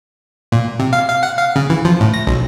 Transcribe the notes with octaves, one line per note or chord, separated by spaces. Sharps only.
A#2
C3
F5
F5
F#5
F5
C#3
E3
F3
A2
A#6
B1